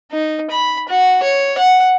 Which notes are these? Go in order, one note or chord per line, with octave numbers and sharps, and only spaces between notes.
D#4
B5
F#4
C#5
F#5